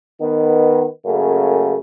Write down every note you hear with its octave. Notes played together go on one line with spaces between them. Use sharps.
D#3 B3
F#2 C#3 A3 A#3